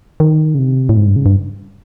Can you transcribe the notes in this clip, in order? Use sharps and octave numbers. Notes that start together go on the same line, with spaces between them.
D#3
C#3
C3
A2
G#2
G2
C#3
G2